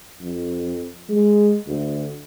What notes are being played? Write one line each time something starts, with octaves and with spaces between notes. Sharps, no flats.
F2
G#3
D2